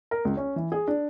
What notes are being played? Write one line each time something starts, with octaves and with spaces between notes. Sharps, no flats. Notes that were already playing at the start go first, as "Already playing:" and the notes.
A#4
C#2
C#4
E3
G#4
D4